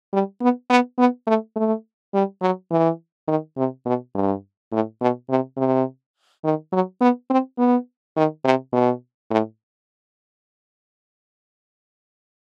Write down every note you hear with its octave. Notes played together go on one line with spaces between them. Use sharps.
G3
B3
B3
B3
A3
A3
G3
F#3
E3
D#3
C3
B2
G2
A2
B2
C3
C3
D#3
F#3
B3
C4
B3
D#3
C3
B2
A2